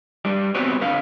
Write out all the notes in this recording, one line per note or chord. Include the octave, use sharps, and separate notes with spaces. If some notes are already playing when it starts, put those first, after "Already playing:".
G2 G3 G4
B3 C4 F#4 G4 B4 C#5
D3 B4 F5